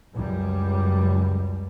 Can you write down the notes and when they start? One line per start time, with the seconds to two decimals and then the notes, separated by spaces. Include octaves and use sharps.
0.13 C#2 F#2 G3